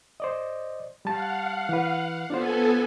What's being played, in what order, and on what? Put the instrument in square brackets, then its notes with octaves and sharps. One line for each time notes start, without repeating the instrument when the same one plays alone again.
[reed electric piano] C5 D5 D#5
[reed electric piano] G3 A5 [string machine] F5 F#5
[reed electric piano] E3 B4
[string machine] B3 A4 G#5 [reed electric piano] D4 F4 C5